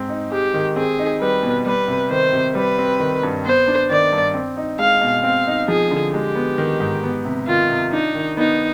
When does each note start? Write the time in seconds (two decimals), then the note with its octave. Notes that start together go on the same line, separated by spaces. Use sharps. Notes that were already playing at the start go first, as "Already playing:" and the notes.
Already playing: G#2 C4
0.09 D#4
0.31 G#3 G4
0.54 D#3
0.76 C4 G#4
0.99 D#4
1.21 G3 B4
1.43 B2
1.66 G3 B4
1.88 C3
2.10 D#3 C5
2.33 C3
2.55 G3 B4
2.78 C4
3.00 D#3
3.23 G2
3.45 B3 C5
3.68 D4
3.90 D#3 D5
4.12 G2
4.34 C4
4.57 D#4
4.79 G#3 F5
5.01 B2
5.23 C4 F5
5.47 D#4
5.68 F3 G#4
5.91 D3
6.13 G#3 G4
6.35 B3
6.58 D#3
6.80 G#2
7.03 B3
7.25 C3
7.47 D#3 F4
7.70 C3
7.92 D4 D#4
8.15 D#3
8.37 B3 D#4